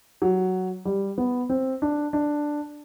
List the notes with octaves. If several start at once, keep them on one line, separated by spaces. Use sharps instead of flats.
F#3
G3
B3
C4
D4
D4